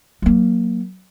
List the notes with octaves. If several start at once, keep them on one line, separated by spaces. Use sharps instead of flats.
F#3 A#3